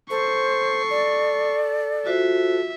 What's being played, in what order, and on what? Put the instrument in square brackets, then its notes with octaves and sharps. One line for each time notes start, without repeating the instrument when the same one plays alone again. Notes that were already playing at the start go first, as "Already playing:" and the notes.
[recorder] A4 [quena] C5 [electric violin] C#6 C7
[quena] D5
[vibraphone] F4 F#4 C5 [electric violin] E5